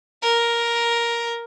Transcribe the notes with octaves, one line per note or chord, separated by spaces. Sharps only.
A#4